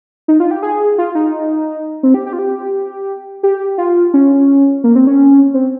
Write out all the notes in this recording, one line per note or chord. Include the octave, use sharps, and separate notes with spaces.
D#4
F4
G4
G#4
F4
D#4
C4
G4
G4
F4
G4
G4
F4
C#4
A#3
C4
C#4
C4